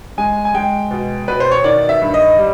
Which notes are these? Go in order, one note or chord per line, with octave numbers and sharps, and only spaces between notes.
G#3 G#5
G#5
G#3 G5
B2
B2 B4
C5
C#5
D#3 D5
E5
G2
D#5
G3